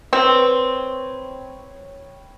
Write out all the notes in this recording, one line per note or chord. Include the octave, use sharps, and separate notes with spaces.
C4 B4 C#5 G5